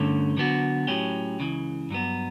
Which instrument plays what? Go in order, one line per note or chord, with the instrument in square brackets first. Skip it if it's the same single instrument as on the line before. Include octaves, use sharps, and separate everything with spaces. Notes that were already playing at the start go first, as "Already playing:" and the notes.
Already playing: [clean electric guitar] G2 D3 A3 C#4
D3 F#3 B3 F#4
A2 F#3 C#4 G4
C#2 C#3 E3
G2 F#3 B3